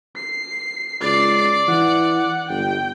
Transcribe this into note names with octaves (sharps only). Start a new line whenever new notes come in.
C7
C#2 D5 A6 C7
E3 F#5
G1 G5